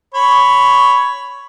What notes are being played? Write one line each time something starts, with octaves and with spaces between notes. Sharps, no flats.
C#5 B5